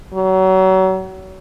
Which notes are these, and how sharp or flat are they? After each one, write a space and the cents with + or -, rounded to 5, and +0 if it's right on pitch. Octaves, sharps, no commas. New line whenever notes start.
F#3 +30